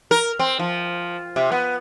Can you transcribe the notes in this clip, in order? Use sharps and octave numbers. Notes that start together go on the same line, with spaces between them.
A#4
C4
F3
C3
B3